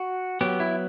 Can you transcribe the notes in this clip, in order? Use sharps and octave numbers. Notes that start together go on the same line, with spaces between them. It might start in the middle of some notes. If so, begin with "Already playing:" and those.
Already playing: F#4
F#3 B3 G4
E4